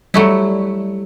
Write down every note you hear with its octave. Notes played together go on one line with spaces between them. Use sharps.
F#3 G3 A3 E4